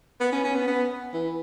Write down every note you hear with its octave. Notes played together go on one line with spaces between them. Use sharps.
B3
C#4
C#4
B3
B3
E3